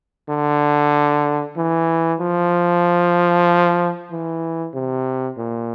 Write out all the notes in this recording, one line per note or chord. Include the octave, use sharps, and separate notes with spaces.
D3
E3
F3
E3
C3
A#2